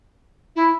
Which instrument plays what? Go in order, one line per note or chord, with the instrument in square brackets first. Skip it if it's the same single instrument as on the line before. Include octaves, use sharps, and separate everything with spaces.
[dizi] E4